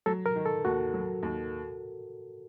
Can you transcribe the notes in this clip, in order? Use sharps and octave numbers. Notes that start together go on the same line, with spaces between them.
F#3 A4
A#4
D#3
A4
D#2 F#4
F#3
D#2